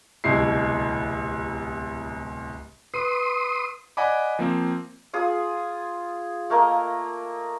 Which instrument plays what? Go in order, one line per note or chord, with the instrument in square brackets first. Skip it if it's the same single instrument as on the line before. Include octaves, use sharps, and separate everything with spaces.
[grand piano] D1 C2 B2 E4 C7
[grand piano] B4 [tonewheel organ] C6 D#6
[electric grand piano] D5 D#5 F#5 G#5 B5 D6
F3 A#3 C4
[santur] F4 G#4 D#6
A3 A#3 A#4 D#5